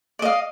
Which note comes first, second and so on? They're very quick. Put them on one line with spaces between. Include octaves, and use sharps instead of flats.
D5 D#5 F5